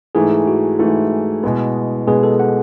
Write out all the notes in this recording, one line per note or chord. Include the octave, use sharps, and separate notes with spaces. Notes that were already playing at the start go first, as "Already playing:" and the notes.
G#2 E3 A3 G#4
F#4
G#2 E3 A3 E4
B2 G#3 B3
B2 G#3 B3 G#4
A4
F#5